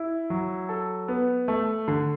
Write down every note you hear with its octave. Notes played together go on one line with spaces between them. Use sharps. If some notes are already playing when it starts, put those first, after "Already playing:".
Already playing: E4
F#3
A4
B3
A3
D3